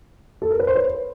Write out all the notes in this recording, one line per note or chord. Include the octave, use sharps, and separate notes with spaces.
A4
A#4
B4
C5
B4 C#5